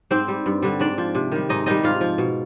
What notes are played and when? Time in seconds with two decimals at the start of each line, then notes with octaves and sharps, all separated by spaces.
0.11 G#2 C4 C5
0.28 G3
0.46 G2
0.62 D3 G3
0.80 G#2 D4 D5
0.98 F3
1.15 C3
1.32 D#3 G3
1.49 G#2 D#4 D#5
1.66 D#3 G3 D#4 D#5
1.83 G#2 F4 F5
2.01 F3
2.18 B2